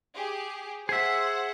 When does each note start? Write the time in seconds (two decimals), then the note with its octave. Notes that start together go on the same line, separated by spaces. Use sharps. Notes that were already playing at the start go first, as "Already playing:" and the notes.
0.15 G4 G#4
0.89 G#4 C5 E5 F#5